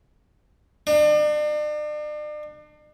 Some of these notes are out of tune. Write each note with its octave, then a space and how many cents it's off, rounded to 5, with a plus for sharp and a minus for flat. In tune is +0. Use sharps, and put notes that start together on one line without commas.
D4 +40